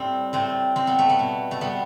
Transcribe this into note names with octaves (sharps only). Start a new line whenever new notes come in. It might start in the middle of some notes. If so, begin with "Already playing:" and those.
Already playing: A2 G3 C4
A2 C4
G3 C4
B3
A3
B3
B2
A3
G3 B3